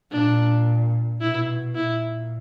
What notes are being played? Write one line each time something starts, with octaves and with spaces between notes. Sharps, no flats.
A#2 D4
B2 E4
A#2 E4